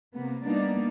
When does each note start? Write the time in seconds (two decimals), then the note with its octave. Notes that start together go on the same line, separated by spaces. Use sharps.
0.14 C3 A#3 B3
0.45 G3 A#3 B3 D4 D#4 D5